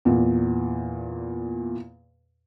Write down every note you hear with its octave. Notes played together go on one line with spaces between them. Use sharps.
E2 A#2